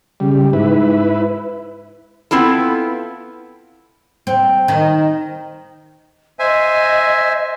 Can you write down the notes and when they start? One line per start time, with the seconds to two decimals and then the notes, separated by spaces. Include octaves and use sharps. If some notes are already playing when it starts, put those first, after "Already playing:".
0.20 C#3 G3
0.53 G#2 E4 B4
2.31 B3 C4 E4 F4 A4
4.27 C4
4.68 D#3
6.39 C5 D#5 E5 G#5